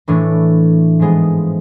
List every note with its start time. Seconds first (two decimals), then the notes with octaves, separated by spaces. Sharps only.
0.08 A2 E3 A3 D4
0.99 G#2 F3 G#3 B3